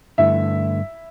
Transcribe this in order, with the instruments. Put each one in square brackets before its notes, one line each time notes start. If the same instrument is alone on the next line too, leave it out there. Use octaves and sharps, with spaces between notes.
[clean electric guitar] G2 D3 A3 [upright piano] E4 E5